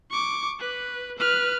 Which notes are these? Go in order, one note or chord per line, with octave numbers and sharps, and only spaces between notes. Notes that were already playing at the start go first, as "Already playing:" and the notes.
C#6 D6
B4
B4 F6